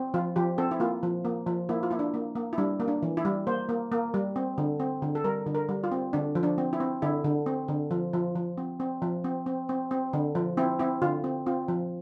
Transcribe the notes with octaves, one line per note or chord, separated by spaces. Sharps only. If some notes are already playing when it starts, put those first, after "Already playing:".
Already playing: C4
F3 F4
F3 G4
C4 A4
E4
A#3 F4
F3
A#3
F3
A#3 E4
F4
A#3 E4
D4
A#3
A#3
E4
G3 D4
A#3
D4
E3
E4
G3
A#3 C5
A#3
A#3
G3
C4
D3
C4
D3
A4
G3 A#4
D3
A#4
G3
F4
C4
D3 D4
F3
D4
C4
E4
C4
D3 E4
D3
C4
D3
F3
F3
F3
C4
C4
F3
C4
C4
C4
C4
D3
F3
C4 E4
C4 E4
D3 F4
C4
C4 F4
F3